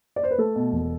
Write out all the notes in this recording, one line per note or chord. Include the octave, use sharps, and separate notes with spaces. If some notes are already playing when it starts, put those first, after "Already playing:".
D5
C5
B4
A3 A4
B2
E1